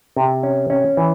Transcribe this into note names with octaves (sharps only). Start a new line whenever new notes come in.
C3
C#4
C#4
E3